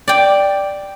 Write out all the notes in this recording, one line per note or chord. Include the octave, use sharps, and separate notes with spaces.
D5 G5